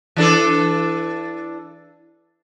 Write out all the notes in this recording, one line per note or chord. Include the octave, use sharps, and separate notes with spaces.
E3 D4 A4